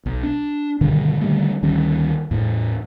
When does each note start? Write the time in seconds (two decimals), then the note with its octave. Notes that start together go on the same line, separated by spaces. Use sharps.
0.06 B1
0.23 D4
0.81 G2 B2 D3 D#3
1.21 D3 D#3 G3 A3
1.63 D2 D#3 G3 C#4
2.31 E2 A2